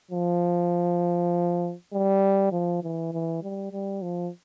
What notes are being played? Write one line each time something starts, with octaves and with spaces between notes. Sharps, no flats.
F3
G3
F3
E3
E3
G3
G3
F3